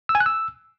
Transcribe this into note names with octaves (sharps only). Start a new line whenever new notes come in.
E6
G#5
F#6
E6